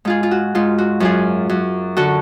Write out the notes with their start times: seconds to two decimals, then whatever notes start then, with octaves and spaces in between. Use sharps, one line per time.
0.05 G#2 F4 G#4
0.23 F4
0.31 F#4
0.55 G#2 F4
0.78 F#4
1.00 F#2 F4 G#4
1.49 F#2
1.97 D3 F#4 A4